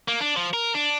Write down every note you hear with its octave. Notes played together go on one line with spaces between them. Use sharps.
A#3
D4
F3
A#4
D4